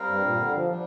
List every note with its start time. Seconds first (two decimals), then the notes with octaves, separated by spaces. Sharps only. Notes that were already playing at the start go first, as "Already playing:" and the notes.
Already playing: G3 C4 A#4 F5
0.08 G2
0.24 A#2
0.39 D3
0.56 F3
0.72 G3 D4